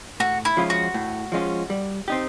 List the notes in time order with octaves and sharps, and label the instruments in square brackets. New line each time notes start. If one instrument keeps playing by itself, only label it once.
[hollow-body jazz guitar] A2 [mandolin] F#4
[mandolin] E4
[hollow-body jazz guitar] F3 G#3 C#4 F4
[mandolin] F#4
[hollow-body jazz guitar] A2
F3 G#3 C#4 F4
G3
C4 D#4 G4